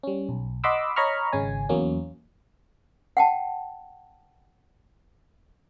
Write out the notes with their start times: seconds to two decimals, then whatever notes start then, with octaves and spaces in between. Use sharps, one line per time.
0.03 G3 C#4
0.29 B1
0.64 D#5 F#5 B5 C6 D6 E6
0.96 C#5 D#5 A#5 B5 C#6 F6
1.32 G#1 C#3 C#4 G#5
1.69 E2 F#3 A#3 C#4
3.17 F#5 G5 A5